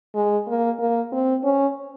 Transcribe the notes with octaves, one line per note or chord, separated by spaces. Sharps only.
G#3
A#3
A#3
C4
C#4